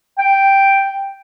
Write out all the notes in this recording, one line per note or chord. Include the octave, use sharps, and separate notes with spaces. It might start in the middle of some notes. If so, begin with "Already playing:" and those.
G5